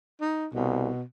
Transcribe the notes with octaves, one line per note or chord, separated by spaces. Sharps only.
D#4
C2 B2